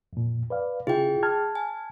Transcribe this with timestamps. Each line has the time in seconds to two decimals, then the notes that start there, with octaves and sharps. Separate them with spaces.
0.13 F2 A#2
0.50 B4 D5 F5
0.87 C#3 E4 F4 G#4 G5
1.23 A5 F6 G#6
1.55 G#5